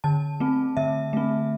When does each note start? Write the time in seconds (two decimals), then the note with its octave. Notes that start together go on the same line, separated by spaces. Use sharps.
0.04 D3 A5
0.40 A3 C4
0.77 D3 E5
1.13 A3 C4